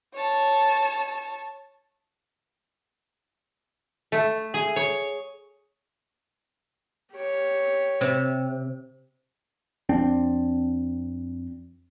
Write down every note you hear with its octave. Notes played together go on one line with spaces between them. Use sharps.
C#5 A5
A3
G#4
C#5
G4 C#5
C3
F2 C4 D4